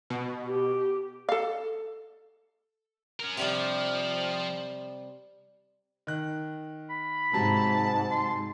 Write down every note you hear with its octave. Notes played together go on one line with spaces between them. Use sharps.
B2
G4
A4 F5
C#4 A#4
C3 F3 G3 G4
D#3 F#6
B5
G#2 C3 F#3 A5 A#5
C6